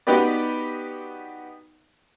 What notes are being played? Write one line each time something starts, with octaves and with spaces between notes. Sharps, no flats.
B3 D#4 F#4 G4 B4 D5